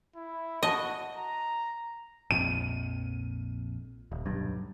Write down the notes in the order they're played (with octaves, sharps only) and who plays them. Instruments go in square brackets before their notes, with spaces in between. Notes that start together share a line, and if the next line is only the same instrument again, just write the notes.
[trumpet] E4
[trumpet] F#4 [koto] D#5 [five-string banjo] A5 B5
[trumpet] A#5
[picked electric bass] A#1 F2 [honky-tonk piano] D#7
[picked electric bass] D#1
D1 B1 G2